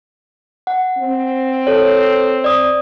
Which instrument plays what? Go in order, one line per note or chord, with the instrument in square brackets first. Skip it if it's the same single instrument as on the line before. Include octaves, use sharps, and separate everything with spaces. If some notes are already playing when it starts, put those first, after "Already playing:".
[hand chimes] F#5
[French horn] C4
[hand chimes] A4 C#5
D5 D#6